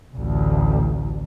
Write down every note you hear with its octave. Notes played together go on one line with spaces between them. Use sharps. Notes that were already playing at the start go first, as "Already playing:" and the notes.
A1 D2